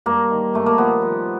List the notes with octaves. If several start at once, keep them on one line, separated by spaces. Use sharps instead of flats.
G2 A#3
D#3
G2 A3
A#3
F3 B3
F3